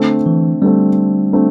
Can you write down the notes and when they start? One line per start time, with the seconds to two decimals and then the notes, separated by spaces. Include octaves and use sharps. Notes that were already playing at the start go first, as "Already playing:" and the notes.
Already playing: D3 A3 C4
0.26 E3
0.62 D3 G3 A3 C4
1.33 D3 A3 C4